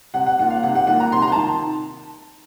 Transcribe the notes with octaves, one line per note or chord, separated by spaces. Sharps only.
C3 F#5
F#5
D#3 A#3 F4 F#5
F5
C3 F#5
F#5
D#3 A#3 F4 F#5
A#5
C3 C6
A#5
D#3 A5